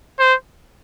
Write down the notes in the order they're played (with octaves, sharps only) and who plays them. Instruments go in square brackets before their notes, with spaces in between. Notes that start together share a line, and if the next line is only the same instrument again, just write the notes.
[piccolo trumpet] C5